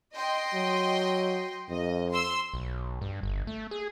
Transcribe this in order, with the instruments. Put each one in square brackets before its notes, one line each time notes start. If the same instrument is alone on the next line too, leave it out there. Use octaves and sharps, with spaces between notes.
[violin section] D#5 G5 C6
[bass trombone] F#3
[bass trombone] F2 [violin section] D#5
[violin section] C6 E6
[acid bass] B1
G2
G1
A3
G#4